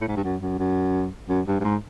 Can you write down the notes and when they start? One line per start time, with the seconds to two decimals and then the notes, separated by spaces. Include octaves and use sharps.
0.01 A2
0.08 G#2
0.17 G2
0.24 F#2
0.42 F#2
0.59 F#2
1.29 F#2
1.47 G2
1.60 G2
1.64 G#2